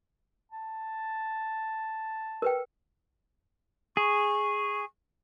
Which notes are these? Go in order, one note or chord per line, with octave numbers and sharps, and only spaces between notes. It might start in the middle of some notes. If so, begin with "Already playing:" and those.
A5
A#4 B4 G5
G#4 C#6